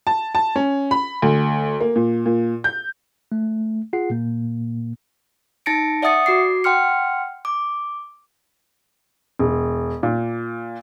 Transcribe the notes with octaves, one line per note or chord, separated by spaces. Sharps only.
A5
A5
C#4
B5
D2
A#3
A#2
A#2
G6
A3
F4 G#4 F#5 C7
A#2 A#3
D#4 A5 A6 A#6 C#7 D7
D5 E5 F#5 D#6 A6 C#7
F#4 D6 C7
F#5 G5 C6 F6 C#7
D6
E1
A#2